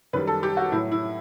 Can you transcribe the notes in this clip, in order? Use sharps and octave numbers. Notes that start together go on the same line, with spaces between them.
F#2 D#3 G3 B4
A4
G4
F#4
A2 F#3 E4
E4